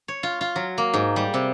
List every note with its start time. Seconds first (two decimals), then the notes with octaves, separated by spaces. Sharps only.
0.08 C#5
0.23 F4
0.41 F4
0.56 F#3
0.78 A#3
0.94 G#2
1.16 G3
1.34 C3